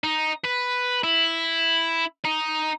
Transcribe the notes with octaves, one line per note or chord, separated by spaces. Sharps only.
D#4
B4
E4
D#4